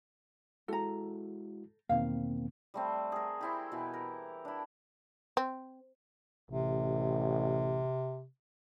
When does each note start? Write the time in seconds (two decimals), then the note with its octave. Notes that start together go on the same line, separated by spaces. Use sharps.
0.68 G#3 E4 F#4 A4 A#5
1.89 E2 B2 D#3 A#3 C4 F5
2.74 G3 A3 C4
3.12 G#4 A#4
3.41 C4 E4 G4
3.72 B2 E3
3.93 A#4
4.45 D4 E4
5.37 C4
6.51 A1 C3